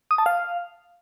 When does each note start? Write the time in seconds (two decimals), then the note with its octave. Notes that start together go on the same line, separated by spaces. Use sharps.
0.11 D#6
0.18 A5
0.26 F5